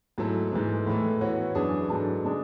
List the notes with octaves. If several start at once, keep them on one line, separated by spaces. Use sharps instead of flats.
G#2 F#3 A3 E4 A4
G#2 E3 A3
A2 E3 A3
E3 B3 F#4 C#5
F#2 E3 B3 D4 G#4
G#2 F#3 B3 D4 A4
C#3 G#3 D4 G#4